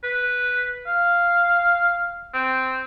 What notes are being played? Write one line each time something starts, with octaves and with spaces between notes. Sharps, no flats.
B4
F5
C4